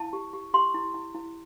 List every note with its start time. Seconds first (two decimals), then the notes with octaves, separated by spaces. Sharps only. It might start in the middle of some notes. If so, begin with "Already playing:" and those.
Already playing: E4 A5
0.13 G4
0.33 G4
0.54 G4 C6
0.74 E4
0.94 E4
1.14 E4